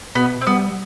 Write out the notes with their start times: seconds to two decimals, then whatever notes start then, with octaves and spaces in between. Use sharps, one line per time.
0.15 B2 B3
0.41 C4
0.47 G3 B3